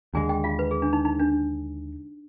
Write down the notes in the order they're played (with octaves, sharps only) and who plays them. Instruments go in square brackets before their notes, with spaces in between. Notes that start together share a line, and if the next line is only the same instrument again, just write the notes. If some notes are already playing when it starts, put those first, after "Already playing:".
[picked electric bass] D#2 D3 G#3 [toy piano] G#4 G#5
[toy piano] G4 G5
F4 F5
B4
G#4
D4
D#4
D#4
D4